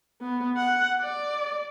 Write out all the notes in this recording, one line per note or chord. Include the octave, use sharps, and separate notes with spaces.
B3
F#5
D5